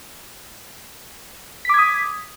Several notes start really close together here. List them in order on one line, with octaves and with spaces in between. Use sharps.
B6 D6 G#6 D#6